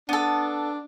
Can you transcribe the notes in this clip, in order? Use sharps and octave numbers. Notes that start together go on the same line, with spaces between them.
B3 D4 A4